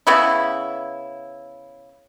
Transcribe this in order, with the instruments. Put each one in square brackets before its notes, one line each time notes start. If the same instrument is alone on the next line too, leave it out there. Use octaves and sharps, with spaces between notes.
[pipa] C#3 B3 E4